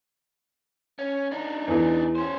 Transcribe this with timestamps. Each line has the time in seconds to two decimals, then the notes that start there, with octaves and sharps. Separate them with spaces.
0.99 C#4
1.32 D4 D#4
1.67 E2 E3
2.15 C#4 C5